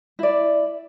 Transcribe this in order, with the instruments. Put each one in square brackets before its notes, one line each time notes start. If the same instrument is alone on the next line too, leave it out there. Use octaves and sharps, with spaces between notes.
[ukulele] E4 D5